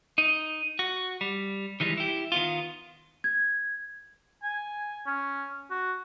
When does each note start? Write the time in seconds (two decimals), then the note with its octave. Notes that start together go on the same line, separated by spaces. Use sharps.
0.18 D#4
0.79 F#4
1.21 G3
1.80 D#3 E3 G3 G#3
1.97 E4 G4
2.32 D#3 B3 F4
3.24 G#6
4.43 G#5
5.06 C#4
5.71 F#4